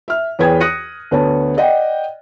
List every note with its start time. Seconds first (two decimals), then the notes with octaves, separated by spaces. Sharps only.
0.08 E5 F6
0.39 E2 G#4 B4 C#5 G5 G#6
0.61 D#6 F#6 A#6 C#7 D#7
1.11 D2 B3 C#5 A5
1.57 D5 D#5 F#5 G5